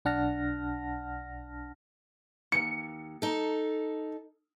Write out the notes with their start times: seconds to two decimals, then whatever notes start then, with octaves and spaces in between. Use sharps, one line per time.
0.05 B1 D4 F#5 A5 F6 A#6
2.52 D#2 C#7
3.22 D#4 A4